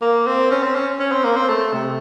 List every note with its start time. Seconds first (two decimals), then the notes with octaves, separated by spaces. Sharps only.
0.01 A#3
0.27 C4
0.51 C#4
0.63 C4
0.75 C#4
1.00 C#4
1.12 C4
1.24 A#3
1.36 C4
1.49 A3
1.73 C3